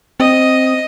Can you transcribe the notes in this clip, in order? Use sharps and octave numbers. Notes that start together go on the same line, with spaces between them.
C4 D#5